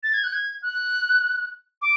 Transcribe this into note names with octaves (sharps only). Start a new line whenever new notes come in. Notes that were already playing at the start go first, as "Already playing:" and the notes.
A6
G#6
F#6
G#6
F#6
D6